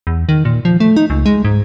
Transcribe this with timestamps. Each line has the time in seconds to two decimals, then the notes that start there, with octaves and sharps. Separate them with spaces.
0.07 E2
0.29 D#3
0.45 A#2
0.65 F3
0.80 A3
0.97 D#4
1.10 C#2
1.26 G#3
1.45 G#2